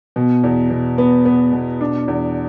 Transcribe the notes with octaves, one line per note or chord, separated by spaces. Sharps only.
B2
E2
B2
B3
B3
B2
D4
E2